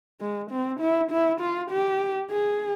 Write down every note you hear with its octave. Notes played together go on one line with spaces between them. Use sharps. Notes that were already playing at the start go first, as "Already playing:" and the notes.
G#3
C4
E4
E4
F4
G4
G#4